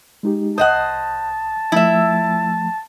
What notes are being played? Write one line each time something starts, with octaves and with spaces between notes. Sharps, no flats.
G#3 D#4 G4
C2 C5 D#5 F#5 A5 D#6
F3 A3 E4 E5